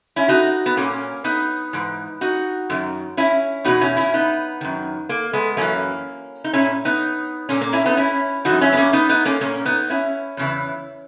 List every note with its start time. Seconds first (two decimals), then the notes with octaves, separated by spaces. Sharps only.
0.16 C#4 E4
0.28 D#4 F#4
0.66 B3
0.77 A#2 A#3 C#4
1.24 B3 D#4
1.73 G#2 E3
2.21 D#4 F#4
2.70 F#2 D#3
3.17 C#4 E4
3.65 E2 B2 D#4 F#4
3.81 C#4 E4
3.97 C#4 E4
4.14 B3 D#4
4.61 F#2 D#3
5.09 A#3
5.33 G#3 B3
5.57 F#2 E3 A#3 C#4
6.44 D#4
6.53 A#2 C#4 E4
6.85 B3 D#4
7.49 A#2 A#3 C#4
7.61 A#3
7.73 C#4 E4
7.85 B3 D#4
7.97 C#4 E4
8.45 F#2 E3 D#4 F#4
8.61 C#4 E4
8.72 B3
8.77 A#3 C#4
8.93 B3 D#4
9.09 B3 D#4
9.25 A#3 C#4
9.41 A#2 A#3 C#4
9.65 B3 D#4
9.90 C#4 E4
10.37 E2 C#3 E3